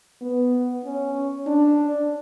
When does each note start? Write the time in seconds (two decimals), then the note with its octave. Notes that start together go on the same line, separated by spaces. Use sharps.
0.22 B3
0.85 C#4
1.47 D4